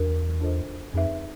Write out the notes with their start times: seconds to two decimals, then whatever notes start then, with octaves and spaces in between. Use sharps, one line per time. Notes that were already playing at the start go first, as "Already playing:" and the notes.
Already playing: E2 D4 F#4 A#4
0.41 D4 F4 A4 C5 D#5
0.93 F2 C4 D#4 G#4 B4 E5